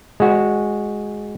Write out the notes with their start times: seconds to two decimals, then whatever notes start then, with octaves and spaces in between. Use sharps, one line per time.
0.20 G#3 F#4